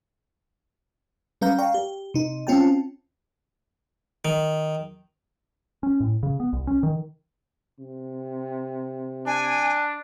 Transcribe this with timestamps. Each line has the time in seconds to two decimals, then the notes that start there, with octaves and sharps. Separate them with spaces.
1.41 G3 C#4 B4 F5 A#5 G6
1.59 D5 F5 G5 A#5 C#6
1.74 G4
2.14 C3 D#4
2.47 C4 C#4 F4 G5 A5
4.25 D#3
5.83 C#4
6.00 A2
6.23 C#3
6.40 B3
6.53 C2
6.67 C#4
6.83 D#3
7.79 C3
9.27 D4 G#5